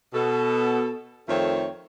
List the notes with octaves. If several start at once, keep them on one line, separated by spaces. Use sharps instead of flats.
B2 A4
F2 D#3 A3 C4 C5 C#5